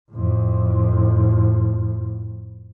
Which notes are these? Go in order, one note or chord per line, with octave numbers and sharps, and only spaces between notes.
F2 A2